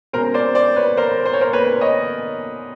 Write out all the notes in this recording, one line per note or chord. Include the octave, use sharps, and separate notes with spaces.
B2 G#3 C#4 A#4 C5
C5 D5
C5 D5
B4 C#5
A#4 C5
C5
C#5
A#4 C5
B4 C#5
C#5 D#5